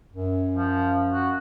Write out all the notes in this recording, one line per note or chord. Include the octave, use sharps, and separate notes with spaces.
F#2
F3
F#4